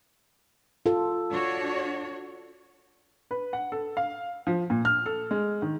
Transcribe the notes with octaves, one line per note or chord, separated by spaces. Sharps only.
F4 A4
D4 F#4 C#5
B4
F#5
A4
F5
F3
A#2
F6
A4
G#3
D#3